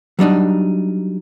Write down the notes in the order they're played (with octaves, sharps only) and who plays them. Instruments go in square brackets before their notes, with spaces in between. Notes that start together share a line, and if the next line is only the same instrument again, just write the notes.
[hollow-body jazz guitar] F#3 G3 D4 D#4